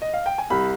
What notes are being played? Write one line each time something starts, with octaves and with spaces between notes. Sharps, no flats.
D#5
F5
G5
G#5
C2 B5